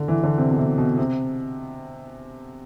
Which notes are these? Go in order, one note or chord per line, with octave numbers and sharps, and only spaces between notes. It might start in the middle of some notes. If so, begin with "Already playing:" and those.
Already playing: D3
E3
D3
C3
B2
C3
B2
C3